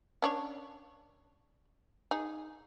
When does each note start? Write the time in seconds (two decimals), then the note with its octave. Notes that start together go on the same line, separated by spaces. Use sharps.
0.22 C#4 D4 C#5
2.11 D#4 G#4